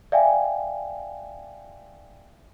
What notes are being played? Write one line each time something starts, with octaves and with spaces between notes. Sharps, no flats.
D5 E5 F5 G5 G#5